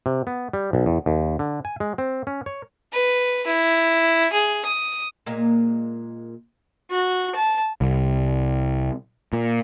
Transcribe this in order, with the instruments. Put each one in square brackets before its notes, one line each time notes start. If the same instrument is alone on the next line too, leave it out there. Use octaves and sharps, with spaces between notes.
[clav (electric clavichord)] C3
B3
G3
B1
E2
D#2
D3
G#5
G#3
C4
C#4
C#5
[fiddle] B4
E4
G#4
D#6
[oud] A#2 G#3 A#3
[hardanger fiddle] F#4
A5
[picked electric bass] C2
A#2